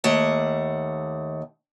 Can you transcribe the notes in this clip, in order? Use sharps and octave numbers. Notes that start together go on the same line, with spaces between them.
D#2 A3 F#5